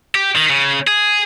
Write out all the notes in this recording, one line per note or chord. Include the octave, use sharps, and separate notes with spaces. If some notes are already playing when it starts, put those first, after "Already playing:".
G4
D#3
C#3
G#4